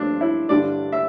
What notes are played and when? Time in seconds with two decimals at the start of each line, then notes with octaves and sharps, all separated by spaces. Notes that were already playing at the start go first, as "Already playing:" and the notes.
Already playing: G2 F3 A3 C4 D4
0.21 E4
0.49 G2 D3 G3 D4 D5
0.92 E5